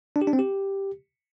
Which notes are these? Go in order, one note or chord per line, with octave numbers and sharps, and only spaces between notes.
D4
G4
D4
C4
G4